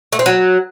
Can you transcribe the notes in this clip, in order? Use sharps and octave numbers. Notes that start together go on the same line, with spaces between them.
A3
C4
F#3